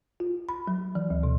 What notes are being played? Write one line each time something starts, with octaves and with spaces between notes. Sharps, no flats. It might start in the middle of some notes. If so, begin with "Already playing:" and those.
F4
B5
F#3
E3
D2
B2